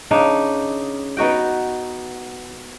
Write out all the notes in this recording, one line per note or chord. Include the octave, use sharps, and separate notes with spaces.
C#3 D4 D#4
B3 D#4 F#4 G5